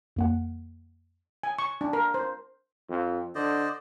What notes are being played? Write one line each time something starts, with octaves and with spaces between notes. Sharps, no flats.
F2 A#3 F#5
G#5
C#6
D4
A#4
C5
F2
D3 C5 D5 D#5